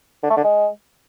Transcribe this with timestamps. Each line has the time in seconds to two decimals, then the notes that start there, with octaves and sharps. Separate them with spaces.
0.23 D3
0.30 A3
0.37 D3
0.44 G#3